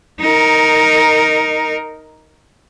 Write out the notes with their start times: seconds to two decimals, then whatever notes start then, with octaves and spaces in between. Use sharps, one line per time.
0.20 D#4 A#4